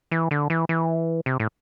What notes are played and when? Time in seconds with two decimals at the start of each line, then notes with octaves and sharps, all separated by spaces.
0.11 E3
0.31 D3
0.50 E3
0.69 E3
1.26 C3
1.40 A2